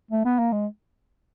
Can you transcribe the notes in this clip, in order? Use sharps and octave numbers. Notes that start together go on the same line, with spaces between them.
A3
B3
A#3
G#3